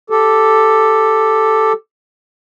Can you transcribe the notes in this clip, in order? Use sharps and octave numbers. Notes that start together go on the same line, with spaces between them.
G4 A4